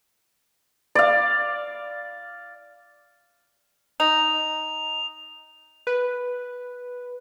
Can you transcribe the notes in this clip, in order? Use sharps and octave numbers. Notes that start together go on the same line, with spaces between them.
D5 F5
D#4 F7
B4